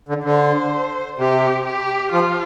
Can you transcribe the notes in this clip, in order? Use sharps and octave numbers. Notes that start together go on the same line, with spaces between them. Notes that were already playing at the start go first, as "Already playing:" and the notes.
D3
D3 C5
C3 G4
G4
F3 F4